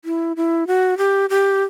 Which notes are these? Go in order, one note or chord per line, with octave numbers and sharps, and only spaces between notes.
E4
E4
F#4
G4
G4